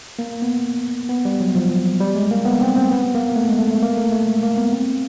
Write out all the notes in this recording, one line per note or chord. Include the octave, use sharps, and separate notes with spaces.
A#3
B3
B3
G3
F#3
F3
G3
G#3
A#3
B3
C4
C4
B3
A#3
A3
G#3
A3
A3
A#3
A3
A3
G#3
A#3
B3
C4